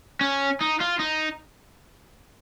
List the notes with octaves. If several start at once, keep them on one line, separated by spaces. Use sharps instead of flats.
C#4
D#4
F4
D#4